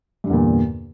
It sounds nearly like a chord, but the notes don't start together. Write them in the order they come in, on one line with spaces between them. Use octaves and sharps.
G2 D3 E2 A#2